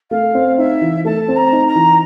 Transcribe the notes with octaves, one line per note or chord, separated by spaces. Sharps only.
A3 F5
C4
D#4 E5
E3
A3 A5
C4
A#5
D#4
A#5
E3